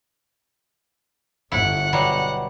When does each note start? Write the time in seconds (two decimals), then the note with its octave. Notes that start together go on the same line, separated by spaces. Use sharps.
1.52 G1 E4 F#5
1.93 B2 F#3 G3